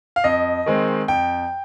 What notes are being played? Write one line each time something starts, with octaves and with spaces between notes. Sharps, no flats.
F5
F2 D#5
D#3 G#3 C4
F2 G5